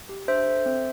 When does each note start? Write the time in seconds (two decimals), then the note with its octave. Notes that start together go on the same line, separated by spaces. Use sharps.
0.09 G4
0.28 D4 C5 E5
0.47 A4
0.66 C4